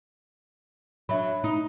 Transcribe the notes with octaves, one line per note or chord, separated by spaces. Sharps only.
F#3 D4 E5 B5
D#4